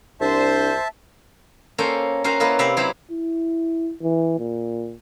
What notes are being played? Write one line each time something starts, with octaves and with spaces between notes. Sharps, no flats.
C2 D4 C5 E5 A5
A#3 C#4 A4 C5 G5
C#4 F#4 A#4 C5 F5
A#3 E4 F4 B4 D#5 F5
C3 E5 F5 G5 A#5 B5
F#3 C4 E4 G4 B4 C5
E4
E3
A#2